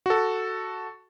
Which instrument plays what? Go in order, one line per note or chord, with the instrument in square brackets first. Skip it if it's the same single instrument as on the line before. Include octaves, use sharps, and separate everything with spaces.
[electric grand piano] F#4 A4